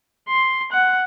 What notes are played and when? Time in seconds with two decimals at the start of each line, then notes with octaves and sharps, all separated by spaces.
0.28 C6
0.72 F#5